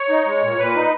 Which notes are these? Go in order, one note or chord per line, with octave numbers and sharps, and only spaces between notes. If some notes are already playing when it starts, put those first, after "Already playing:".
Already playing: C#5
D#4
G#3
A#2
A#2 B4
D#4